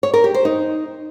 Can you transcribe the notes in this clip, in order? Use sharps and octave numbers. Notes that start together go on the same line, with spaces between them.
C#5
A#4
G4
C5
D#4